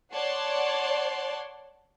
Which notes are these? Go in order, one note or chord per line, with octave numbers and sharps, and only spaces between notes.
C#5 D5 F#5 A5 C6